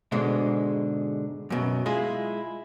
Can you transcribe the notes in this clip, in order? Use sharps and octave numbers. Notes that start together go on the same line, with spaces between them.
G#2 B2 D3 G#3
F#2 B2
G#3 E4 F4 G#4